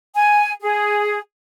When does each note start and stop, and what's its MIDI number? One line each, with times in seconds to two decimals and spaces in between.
0.15 0.50 80
0.62 1.18 68